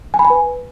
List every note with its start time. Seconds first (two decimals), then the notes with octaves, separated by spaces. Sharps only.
0.14 G#5
0.19 B5
0.25 G#5
0.30 B4